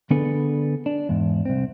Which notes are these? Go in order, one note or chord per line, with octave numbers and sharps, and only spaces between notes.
D3 B3 D4 G#4 A4 B4
D4
E2 G#2
C2 C4